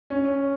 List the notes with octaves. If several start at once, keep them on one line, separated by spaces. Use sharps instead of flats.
C#4